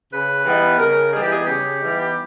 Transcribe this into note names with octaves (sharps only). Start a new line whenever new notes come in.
C#3 B4
E3 G3 B3 D#4
C#3 A#4
E3 G3 B3 D#4 G#4
G4
G#4
C#3 G4
E3 G3 B3 D#4
G4